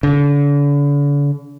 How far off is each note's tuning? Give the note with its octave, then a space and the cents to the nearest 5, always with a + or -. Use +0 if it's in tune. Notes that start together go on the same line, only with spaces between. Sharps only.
D3 -40